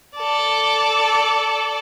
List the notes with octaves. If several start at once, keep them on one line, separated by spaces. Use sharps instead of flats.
A4 D5